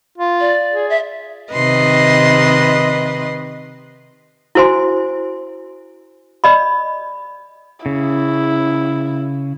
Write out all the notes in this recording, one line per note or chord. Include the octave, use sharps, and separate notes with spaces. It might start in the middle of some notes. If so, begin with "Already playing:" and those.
F4
D5
G#4
E5
C3 D#3 B4 D#5 C6
E4 F#4 C5 G#5 C6
D5 D#5 B5
C#3 E4